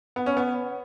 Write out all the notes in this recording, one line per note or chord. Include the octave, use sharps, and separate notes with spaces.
B3
C#4
B3